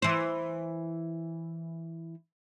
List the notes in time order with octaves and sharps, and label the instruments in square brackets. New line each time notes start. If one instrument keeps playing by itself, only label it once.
[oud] E3 C5